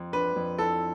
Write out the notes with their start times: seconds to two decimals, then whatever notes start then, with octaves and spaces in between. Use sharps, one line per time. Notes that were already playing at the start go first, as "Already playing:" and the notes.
Already playing: F2
0.13 D4 B4
0.36 F2
0.58 E4 A4